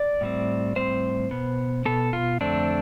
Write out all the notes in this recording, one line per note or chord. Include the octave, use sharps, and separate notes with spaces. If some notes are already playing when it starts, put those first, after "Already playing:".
Already playing: D5
A2 G3 C4
A2 G3 C4 C5
B2 B3
B2 B3 A4
F4
F2 D3 A3 C4 D4